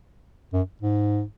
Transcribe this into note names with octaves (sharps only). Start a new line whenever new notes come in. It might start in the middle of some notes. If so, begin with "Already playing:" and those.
F#2
G#2